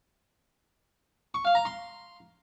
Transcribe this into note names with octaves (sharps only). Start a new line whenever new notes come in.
C#6
F5
A#5
C6